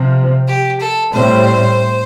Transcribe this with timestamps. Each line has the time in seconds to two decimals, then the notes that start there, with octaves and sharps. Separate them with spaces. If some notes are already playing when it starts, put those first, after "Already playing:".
Already playing: C3 F3 C4
0.48 G4
0.80 A4
1.13 A2 G3 C4 C5